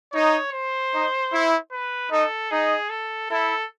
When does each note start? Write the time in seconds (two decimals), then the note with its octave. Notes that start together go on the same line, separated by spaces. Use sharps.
0.13 D#4 C#5
0.52 C5
0.93 D#4
1.31 E4
1.71 B4
2.11 D#4 A4
2.50 D#4 G#4
2.90 A4
3.30 E4 A4